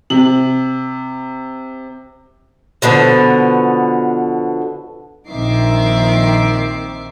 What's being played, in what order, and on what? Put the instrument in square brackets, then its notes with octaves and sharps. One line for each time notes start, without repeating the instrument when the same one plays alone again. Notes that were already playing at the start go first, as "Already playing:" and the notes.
[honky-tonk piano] C3 F#7
[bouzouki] B2 D3 F3 B3
[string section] A#1 D#3 C4 E5 D6 C7